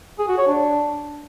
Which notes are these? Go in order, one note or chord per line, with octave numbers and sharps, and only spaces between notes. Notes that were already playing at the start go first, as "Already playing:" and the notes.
G#4
F#4
C#5
D4